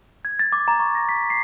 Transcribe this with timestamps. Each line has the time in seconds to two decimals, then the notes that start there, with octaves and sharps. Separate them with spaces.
0.25 G#6
0.39 A6
0.52 D6
0.68 A#5
0.80 C#6
0.95 A#6
1.09 B6
1.30 C7